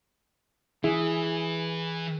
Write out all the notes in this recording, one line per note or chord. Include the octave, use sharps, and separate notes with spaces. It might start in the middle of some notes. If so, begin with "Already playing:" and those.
E3 E4 G#4